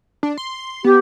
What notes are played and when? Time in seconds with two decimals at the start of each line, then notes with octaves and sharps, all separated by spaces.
0.23 D4
0.38 C6
0.84 B3 G4